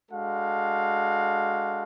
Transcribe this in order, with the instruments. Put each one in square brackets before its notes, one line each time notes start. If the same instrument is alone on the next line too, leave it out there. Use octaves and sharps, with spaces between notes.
[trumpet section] G#3 D4 F#4 A4 F5